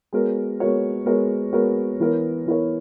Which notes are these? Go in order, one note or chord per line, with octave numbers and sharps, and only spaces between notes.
G#3 B3 F#4 A#4 C#5
G#3 B3 F#4 A#4 C#5
G#3 B3 F#4 A#4 C#5
G#3 B3 F#4 A#4 C#5
E3 B3 E4 A#4 C#5
E3 B3 E4 A#4 C#5